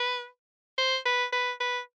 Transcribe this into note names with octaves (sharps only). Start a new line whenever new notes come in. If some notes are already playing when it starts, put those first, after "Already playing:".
Already playing: B4
C5
B4
B4
B4